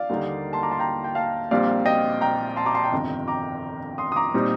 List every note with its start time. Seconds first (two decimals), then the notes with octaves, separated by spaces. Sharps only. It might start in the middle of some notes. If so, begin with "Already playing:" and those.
Already playing: D5 F5
0.09 D#2 D3 G3 A#3 D#4
0.53 A5 C6
0.63 A#5 D6
0.71 A5 C6
0.79 G5 A#5
1.04 G5
1.15 F5 A5
1.51 A#1 A#2 G3 C4 D5 F5
1.86 D#5 G5
2.21 G5 A#5
2.56 A5 C6
2.65 A#5 D6
2.75 A5 C6
2.84 G5 A#5
2.92 G1 F2 C3 D#3
3.28 A#5 D6
3.98 C6 D#6
4.12 D#6
4.16 A#5 D6
4.34 A#2 G3 C4 D#4